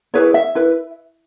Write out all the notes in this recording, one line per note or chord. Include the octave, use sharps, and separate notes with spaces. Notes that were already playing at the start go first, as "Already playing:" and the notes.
E4 G#4 B4 C#5
E5
E4 B4